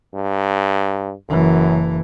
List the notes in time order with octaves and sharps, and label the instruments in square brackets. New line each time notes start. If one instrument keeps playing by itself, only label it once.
[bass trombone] G2
[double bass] F#1 E3 [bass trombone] F#2